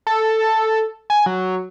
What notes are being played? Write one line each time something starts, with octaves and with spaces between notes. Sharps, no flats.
A4
G#5
F#3